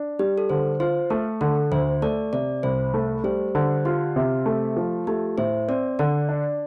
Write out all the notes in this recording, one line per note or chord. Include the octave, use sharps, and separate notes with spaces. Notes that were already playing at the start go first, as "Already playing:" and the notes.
Already playing: D4
G3 G4
A4
D3 C5
F4 C5
A3 A4
D3 A4
D2 C5
A3 D5
C3 D5
C2 C5
A3
G3 C5
D3 C5
F4 G4
C3
A3
F3
A3 G4
A2 C5
C4 D5
D3 D5
D4